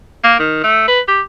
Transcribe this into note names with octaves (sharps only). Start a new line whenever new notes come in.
A#3
D#3
A3
B4
G4